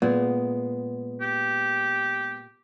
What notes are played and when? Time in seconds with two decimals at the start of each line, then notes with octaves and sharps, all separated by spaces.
0.02 A#2 G#3 B3
1.21 G4